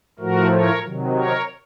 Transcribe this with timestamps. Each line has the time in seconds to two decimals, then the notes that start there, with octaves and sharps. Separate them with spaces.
0.19 A2 F3 A3 F#4 A#4
0.51 A#4 C#5
0.82 C3 D#3 F#3
1.13 A#4 C#5